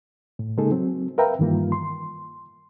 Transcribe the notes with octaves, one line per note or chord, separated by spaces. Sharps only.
A2
C#3 G#3 A#3 D#4 G#4 A4
F#3 C4
A#4 B4 E5 F5 G5 A#5
G2 D#3 E3 G3 A#3 F4
C6